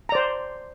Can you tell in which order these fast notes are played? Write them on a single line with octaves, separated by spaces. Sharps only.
A#5 D5 C5